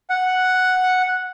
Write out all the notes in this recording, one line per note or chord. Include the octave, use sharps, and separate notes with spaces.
F#5